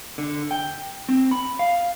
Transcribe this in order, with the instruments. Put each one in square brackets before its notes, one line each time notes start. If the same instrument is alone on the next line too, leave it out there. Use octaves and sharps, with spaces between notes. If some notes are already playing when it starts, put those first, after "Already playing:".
[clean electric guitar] D3
G5
C4
B5
F5